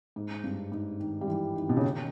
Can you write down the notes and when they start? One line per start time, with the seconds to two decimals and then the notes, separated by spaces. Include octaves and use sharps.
0.16 G#2
0.44 G2
0.72 G#2
1.00 D#3
1.21 G3
1.28 E3
1.56 D#3
1.69 B2
1.77 C#3
1.84 D#3